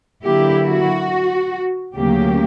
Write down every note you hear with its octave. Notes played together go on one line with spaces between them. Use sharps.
D3 F#3 A#3 E4 G4
F#4
D2 C#3 F#3 A#3 G4